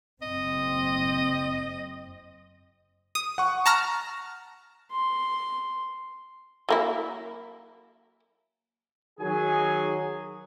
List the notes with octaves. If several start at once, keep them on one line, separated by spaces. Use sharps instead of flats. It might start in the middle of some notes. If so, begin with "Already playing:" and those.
F#1 C4 D#5
D#6
F#5 C#6
A5 A#5 F6
C6
F#3 A#3 E4
D#3 F#3 G#4 G#5